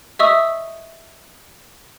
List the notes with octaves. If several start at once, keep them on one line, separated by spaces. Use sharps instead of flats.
D#5 E5 C#6 D#6 E6